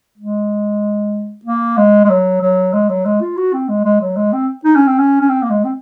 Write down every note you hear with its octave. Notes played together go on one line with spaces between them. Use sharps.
G#3
A#3
G#3
G#3
F#3
F#3
G#3
F#3
G#3
F4
F#4
C4
G#3
G#3
F#3
G#3
C4
D#4
C#4
C4
C#4
C#4
C4
A#3
G#3
C4